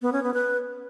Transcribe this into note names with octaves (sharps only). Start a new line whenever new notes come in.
B3
C#4
B3
B4